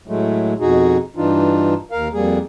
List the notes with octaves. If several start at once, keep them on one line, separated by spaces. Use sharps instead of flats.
A2 F#3 G#3 A3
F2 B2 D#4 F#4 G#4
G2 E3 D4 D#4 F4
D#2 A#4 F5
F2 G3 A#3 G#4